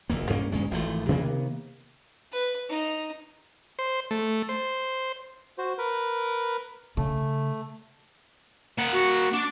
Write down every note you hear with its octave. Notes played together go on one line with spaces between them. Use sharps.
F1 D2 A#3
G2 A#3 C#4
D2 G2 G#3 C#4
G#1 E3 F3 A3
C3 D#3 A#3 B3
B4
D#4
C5
A3
C5
F#4 C5
A#4 B4
C#3 A3
A#3 F#5
F#4
D4 D6